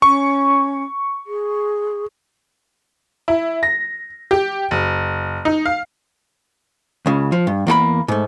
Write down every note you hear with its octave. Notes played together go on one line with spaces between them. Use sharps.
C#4 C#6
G#4
E4
A#6
G4
F#1
D#4
F5
C#2 C#3
F3
G2
E2 A#3 A4 B5
G#2 A3